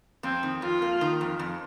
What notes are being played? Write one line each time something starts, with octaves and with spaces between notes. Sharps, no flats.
F2 C4
D#3
F2 F4
A#3
D#3
F2
F2